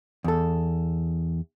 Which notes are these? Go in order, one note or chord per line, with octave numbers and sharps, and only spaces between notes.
E2 A4